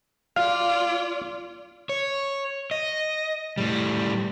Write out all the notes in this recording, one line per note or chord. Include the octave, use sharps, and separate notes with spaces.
F4 D5 F5
C#5
D#5
A2 G3